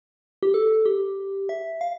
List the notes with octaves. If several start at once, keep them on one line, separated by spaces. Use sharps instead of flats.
G4
A4
G4
E5
F5